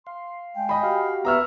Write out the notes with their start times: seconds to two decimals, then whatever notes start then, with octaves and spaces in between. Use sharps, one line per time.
0.07 F5 C6
0.56 G#3 G5 G#5
0.69 D#5 B5
0.83 F#4 G4 F5
1.25 B3 B4 E5 A#5 C#6 E6 F6